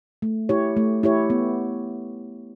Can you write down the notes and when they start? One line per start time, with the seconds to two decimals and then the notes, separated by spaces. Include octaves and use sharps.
0.22 A3
0.49 E4 G4 C#5
0.77 A3
1.03 E4 G4 C#5
1.30 B3